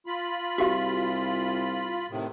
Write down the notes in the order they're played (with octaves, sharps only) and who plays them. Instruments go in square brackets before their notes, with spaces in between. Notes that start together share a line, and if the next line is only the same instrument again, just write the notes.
[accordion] F4 B5
[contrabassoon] C2 [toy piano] F#4 G4 F5
[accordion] A2 C3 D#3